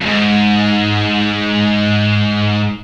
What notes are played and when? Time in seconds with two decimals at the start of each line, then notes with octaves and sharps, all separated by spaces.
0.02 F2 G#2